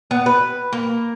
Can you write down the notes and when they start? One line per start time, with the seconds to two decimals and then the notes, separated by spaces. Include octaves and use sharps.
0.11 B3
0.26 B4
0.72 A#3